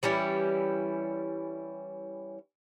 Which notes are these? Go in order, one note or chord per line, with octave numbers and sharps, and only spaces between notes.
E3 G3 C#4 E4